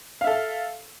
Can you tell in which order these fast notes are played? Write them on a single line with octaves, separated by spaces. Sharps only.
F5 E5 A4